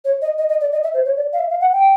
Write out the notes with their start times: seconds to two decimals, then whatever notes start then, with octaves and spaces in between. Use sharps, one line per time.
0.05 C#5
0.22 D#5
0.38 D#5
0.49 D#5
0.61 D5
0.72 D#5
0.83 E5
0.94 C5
1.05 C#5
1.16 D5
1.33 F5
1.39 E5
1.50 F5
1.61 F#5
1.73 G5